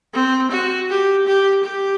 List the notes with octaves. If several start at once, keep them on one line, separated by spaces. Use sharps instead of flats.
C4
F#4
G4
G4
G4